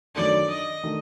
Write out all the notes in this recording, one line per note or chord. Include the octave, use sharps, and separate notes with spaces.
F#2 D#3 A3 D4 D5
D#5
D#3 A3 D4